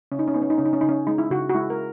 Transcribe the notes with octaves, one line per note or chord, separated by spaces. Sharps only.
C#3 C#4
D#4
C#4
B3 D#4
C#4
D#4
C#3 C#4
D#4
C#4
C#3 D#4
C#4
G#3 D#4
E4
C#3 F#4
F#4
G#3 E4
A#4